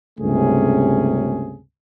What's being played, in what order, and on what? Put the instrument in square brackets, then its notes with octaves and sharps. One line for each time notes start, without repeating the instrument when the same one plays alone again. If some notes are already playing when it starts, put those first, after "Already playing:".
[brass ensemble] C#2 G2 C3 A3 C#4 G#4